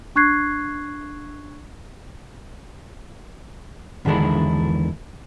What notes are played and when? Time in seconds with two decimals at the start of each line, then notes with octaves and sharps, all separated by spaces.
0.16 D4 C#6 F#6 G#6 C7
4.05 E2 D3 D#3 G#3 D4 E4